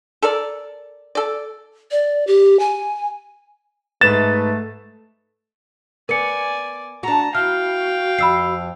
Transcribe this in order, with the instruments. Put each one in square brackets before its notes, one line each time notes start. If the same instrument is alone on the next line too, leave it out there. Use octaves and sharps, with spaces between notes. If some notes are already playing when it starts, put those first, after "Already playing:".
[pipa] A4 A#4 D5
A4 D5
[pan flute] D5
G4
G#5
[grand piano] G#2 B4 E7 [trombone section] A3 [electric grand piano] A6
[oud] B3 [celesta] A#4 C#7 [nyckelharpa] D5 G#5
[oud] D4 F#4 [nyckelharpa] A5 A#5
[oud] E4 [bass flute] F#4 [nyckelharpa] F5 G5 [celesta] F6
[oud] F2 [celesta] B5 E6 C7